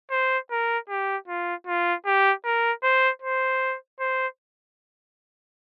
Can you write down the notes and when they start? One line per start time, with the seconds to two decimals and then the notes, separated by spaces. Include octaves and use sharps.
0.11 C5
0.51 A#4
0.90 G4
1.28 F4
1.67 F4
2.06 G4
2.45 A#4
2.83 C5
3.22 C5
4.00 C5